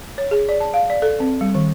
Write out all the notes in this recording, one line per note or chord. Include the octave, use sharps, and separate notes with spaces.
C#5
G#4
D5
A5
F5
D5
A4
C4
G3
D#3